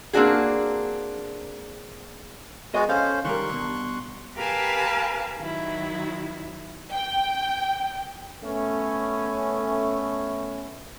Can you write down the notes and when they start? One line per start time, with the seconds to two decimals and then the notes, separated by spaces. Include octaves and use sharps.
0.13 A#3 C4 D4 F#4 G#4
2.74 G#3 B3 F#4 D#5
2.89 C#4 A4 C5 F5
3.25 D#3 G3 A#4 C6 C#6 F#6
3.49 G2 B2
4.35 G4 A#4 B4 F5 G#5 A5
5.38 D#3 F#3 E4
6.93 G5
8.43 A3 B3 C#4